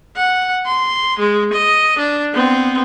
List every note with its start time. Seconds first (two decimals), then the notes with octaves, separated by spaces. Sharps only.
0.16 F#5
0.66 C6
1.19 G#3
1.53 D#5
1.99 D4
2.34 B3 C4